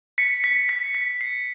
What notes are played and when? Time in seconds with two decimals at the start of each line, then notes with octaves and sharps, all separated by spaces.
0.18 B6 C#7
0.44 B6
0.69 B6
0.95 B6
1.21 C7